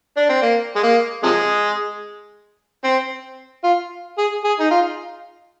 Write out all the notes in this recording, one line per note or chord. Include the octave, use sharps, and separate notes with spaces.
D4
C4
A#3
G#3
A#3
C3 F3 G#3
C4
F4
G#4
G#4
D#4
F4